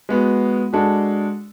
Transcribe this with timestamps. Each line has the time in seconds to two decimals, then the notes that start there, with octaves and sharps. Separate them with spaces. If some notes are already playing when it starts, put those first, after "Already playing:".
0.09 G#3 B3 F#4
0.73 G#3 D4 F#4 A4